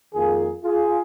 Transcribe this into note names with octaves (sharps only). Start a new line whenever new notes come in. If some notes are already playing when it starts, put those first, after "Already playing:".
F2 D#3 A#3 F4 G#4
F4 G#4